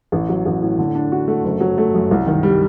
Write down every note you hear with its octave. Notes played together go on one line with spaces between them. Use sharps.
A1
F#3
A1
A2
D3
D4
F#4
A3
F#1
F#3
A3
F#2
C2
D#3
G3